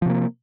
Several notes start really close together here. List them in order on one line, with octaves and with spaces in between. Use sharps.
F3 C3 A#3